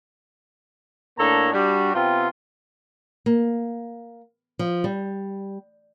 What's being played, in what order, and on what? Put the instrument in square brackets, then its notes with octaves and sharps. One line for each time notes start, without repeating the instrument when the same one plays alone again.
[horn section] A2 A#3 D4 A4 C#5 A#5
G3 D4 F#4
C3 B3 C4 F4
[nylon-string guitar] A#3
F3
G3